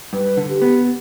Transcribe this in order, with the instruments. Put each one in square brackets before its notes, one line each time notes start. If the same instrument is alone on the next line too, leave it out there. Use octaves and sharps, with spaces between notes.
[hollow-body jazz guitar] G2 [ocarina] B4
[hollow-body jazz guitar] D3
[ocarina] G4
[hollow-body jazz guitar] B3